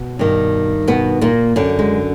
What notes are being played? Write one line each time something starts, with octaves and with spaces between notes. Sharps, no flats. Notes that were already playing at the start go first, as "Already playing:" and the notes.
Already playing: B2
G2 D#3
B2 B3
A#2 A#3
F#2 D3
G#3